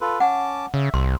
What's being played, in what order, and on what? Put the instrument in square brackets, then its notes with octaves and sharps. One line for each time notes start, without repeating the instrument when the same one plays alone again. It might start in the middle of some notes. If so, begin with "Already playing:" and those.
[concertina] F4 A4 B4
[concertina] C#4 A5 D6 [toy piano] F#5
[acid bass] C#3 [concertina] E5
[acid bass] C2 [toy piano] C6